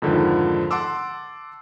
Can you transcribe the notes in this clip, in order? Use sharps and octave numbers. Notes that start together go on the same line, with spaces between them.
F2 G#2 D3 D#3 F3
F#5 A5 C6 D6 E6